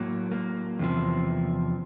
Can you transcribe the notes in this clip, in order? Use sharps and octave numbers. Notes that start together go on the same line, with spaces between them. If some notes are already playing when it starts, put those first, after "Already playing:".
Already playing: A2 F#3 A#3
A#3
E2 C3 F3